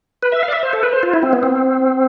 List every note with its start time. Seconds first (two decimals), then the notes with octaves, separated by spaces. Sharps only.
0.23 B4
0.32 E5
0.43 F5
0.48 D5
0.52 E5
0.63 C5
0.73 A4
0.83 B4
0.93 C5
1.03 F4
1.13 E4
1.23 C4
1.33 B3
1.43 C4